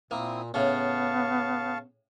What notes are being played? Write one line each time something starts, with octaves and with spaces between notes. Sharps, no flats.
A#2 A#3 C4 E4 D#6
A2 C#3 B3 F5 A5 C#6